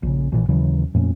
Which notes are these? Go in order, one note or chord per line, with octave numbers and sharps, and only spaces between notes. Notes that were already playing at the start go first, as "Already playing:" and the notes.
A#1 C#3
A#1 A#2 E3
D#2 C#3 E3 F#3
F2 A#2 A3 C#4